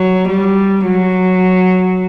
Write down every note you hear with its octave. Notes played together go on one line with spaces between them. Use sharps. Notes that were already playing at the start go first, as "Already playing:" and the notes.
Already playing: F#3
G3
F#3